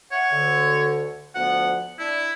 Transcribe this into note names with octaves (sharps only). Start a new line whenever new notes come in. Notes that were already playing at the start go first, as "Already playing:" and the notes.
C#5 E5 F#5
D2 D3
D2 F3 B3 F#5
D4 E4